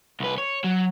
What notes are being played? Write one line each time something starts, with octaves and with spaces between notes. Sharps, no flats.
C2 B4
C#5
F#3